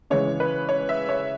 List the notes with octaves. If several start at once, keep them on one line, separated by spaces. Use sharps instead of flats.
C#3 E3 G#3 C#5
B4
C#5
E5
C#5